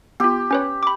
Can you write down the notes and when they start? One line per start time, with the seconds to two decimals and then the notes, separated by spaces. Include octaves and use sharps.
0.20 B3 F4 G4
0.51 C#4 B4 C#5
0.83 B5 D6